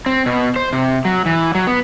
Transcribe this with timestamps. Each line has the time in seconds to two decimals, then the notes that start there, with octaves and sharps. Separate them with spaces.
0.06 C4
0.26 B2
0.56 C5
0.73 C3
1.05 F#3
1.26 E3
1.55 F#3
1.67 B3